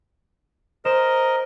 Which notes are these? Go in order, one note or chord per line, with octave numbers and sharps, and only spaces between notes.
A#4 C5 D#5 E7